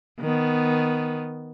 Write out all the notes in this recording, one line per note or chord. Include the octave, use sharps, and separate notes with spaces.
D#3 B3